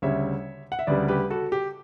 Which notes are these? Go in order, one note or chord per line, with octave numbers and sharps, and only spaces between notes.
D2 C#3 G3 C#5 E5
F#5
E5
D2 C#3 G3 B4 D5
G4 B4
F#4 A4
G4